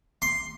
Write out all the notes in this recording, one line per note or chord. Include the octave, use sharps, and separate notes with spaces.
C6